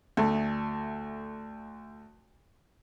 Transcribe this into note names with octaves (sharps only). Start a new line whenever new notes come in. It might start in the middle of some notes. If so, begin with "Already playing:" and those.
D2 A3